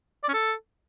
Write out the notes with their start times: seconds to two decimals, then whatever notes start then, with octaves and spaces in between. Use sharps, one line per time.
0.24 D5
0.29 C#4
0.34 A4